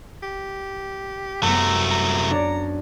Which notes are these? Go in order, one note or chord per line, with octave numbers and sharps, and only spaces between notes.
G4
C2 F#2 A3 B3 A#5
A#5
D4 C#5 D5